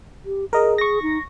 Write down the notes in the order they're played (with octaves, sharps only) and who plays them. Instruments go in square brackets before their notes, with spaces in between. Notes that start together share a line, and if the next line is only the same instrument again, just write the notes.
[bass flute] G4
[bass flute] G#4 [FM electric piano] A#4 D#5
[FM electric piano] C#6 A#6
[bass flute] D#4